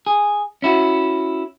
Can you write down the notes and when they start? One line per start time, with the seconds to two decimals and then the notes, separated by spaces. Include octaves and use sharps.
0.07 G#4
0.62 C#4 E4 F#4